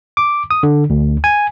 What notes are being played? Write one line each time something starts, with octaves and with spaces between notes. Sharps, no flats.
D6
D#6
D3
D2
G#5